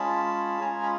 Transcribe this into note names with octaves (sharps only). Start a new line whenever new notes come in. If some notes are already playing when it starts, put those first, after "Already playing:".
Already playing: G#3 C#4 F4 G#4 A5 B5
G#3 C#4 F4 G#4 G#5 A#5
B5